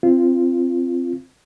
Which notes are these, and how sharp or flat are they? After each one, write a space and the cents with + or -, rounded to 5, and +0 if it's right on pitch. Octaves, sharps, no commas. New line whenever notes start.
C4 +0 F4 -20